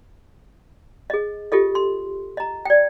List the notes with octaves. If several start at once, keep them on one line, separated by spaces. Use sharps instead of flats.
G#4 D#5
F4 G4 A4 D#5
C6
D#5 A#5
D5 G5